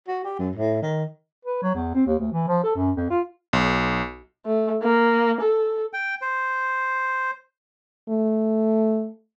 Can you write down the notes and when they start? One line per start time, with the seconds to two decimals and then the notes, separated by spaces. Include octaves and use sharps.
0.08 F#4
0.24 G4
0.39 F#2
0.56 A2
0.82 D#3
1.45 B4
1.62 F#3
1.74 E2
1.94 C4
2.07 D#2
2.20 D2
2.32 E3
2.48 F3
2.64 A4
2.76 F#2
2.97 F2
3.10 F4
3.53 B1
4.45 A3
4.82 A#3
5.41 A4
5.93 G5
6.22 C5
8.09 A3